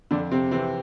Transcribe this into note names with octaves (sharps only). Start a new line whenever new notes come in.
F2 D3 D4
C3 C4
C3 E3 C4